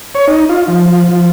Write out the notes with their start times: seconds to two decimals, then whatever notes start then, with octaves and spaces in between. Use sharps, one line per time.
0.15 C#5
0.27 D#4
0.49 F4
0.68 F3
0.88 F3
1.09 F3